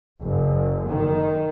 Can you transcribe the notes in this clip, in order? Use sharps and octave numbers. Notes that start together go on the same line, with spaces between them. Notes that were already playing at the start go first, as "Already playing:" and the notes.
F#1
D#3